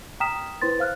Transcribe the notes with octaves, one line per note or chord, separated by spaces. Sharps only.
G5 A#5 D#6 F6 B6 E7
E4 B4 C5 C6 A6
C5 F5 F6 F#6